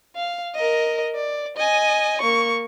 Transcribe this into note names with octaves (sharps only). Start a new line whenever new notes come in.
F5
A#4 D#5
D5
D#5 G#5
A#3 C#6